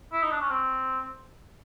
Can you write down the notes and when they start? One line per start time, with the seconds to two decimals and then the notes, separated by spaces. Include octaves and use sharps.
0.12 E4
0.22 D#4
0.31 D4
0.41 C#4
0.50 C4